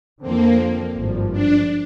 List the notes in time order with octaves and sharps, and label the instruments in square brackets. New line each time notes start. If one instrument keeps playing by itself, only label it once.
[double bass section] F2 D3 F3 C4 [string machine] A#3
[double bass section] G#1 G2 F3
[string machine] D4